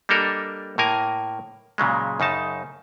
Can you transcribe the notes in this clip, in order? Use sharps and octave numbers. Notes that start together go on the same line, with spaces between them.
G3 A#3 D4 A4 A#4 D#5
A2 A#3 A#4 G#5
A#2 C#3 F#3 G#3
F#2 C#3 D#4 A5